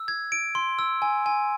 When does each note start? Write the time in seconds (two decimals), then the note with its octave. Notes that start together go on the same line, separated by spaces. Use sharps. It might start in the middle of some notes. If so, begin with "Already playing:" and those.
Already playing: E6
0.08 G#6
0.32 D7
0.55 C6
0.79 E6
1.02 G#5
1.26 G#5